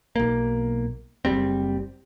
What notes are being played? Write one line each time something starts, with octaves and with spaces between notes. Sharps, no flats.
B1 A#3
F#1 G3 C4